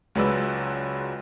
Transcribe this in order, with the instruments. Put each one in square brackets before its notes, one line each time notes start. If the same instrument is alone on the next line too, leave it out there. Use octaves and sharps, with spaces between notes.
[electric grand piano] C#2 F#3 G#3 B4 D5 E6